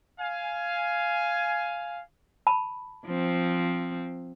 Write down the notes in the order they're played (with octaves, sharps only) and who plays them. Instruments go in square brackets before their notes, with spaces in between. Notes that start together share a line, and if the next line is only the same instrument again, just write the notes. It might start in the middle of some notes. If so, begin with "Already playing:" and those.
[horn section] F5 G#5
[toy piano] A5 B5
[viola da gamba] F3 C4